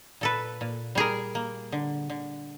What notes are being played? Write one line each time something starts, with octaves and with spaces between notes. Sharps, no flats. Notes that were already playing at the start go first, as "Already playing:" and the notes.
A#2 A4 B4
A#2
G3 G#4 A#4
A#3
D3
D3